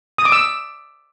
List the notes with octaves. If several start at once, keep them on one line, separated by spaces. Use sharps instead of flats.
D#6
D6
E6